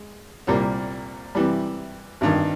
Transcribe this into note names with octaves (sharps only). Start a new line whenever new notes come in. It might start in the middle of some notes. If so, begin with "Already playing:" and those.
Already playing: G#3
C2 A#2 G3 A#3
C3 E3 G3
G#1 G2 D#3